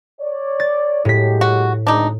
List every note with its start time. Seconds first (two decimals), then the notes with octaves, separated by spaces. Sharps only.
0.20 C#5 D5
0.60 A6
1.05 A2 F#3 G#3 G4 B6
1.41 F#4
1.87 G#1 D2 G#2 D4 D#4